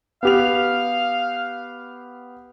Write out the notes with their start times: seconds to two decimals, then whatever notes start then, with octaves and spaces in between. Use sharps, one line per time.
0.23 B3 G4 F5 F7